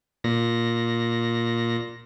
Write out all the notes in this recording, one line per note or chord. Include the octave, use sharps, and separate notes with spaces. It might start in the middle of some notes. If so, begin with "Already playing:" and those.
A#2 A#6